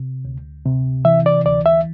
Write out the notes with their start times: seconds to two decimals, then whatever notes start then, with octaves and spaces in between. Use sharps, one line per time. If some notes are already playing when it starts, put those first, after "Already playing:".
Already playing: C3
0.25 D2
0.66 C3
1.05 E3 E5
1.26 D5
1.46 D2 D5
1.66 E5